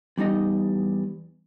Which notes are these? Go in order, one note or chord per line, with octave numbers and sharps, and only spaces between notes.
E2 G3 D#4 D#5